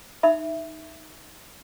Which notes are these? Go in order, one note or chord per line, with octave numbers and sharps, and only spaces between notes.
D#4 E5 B5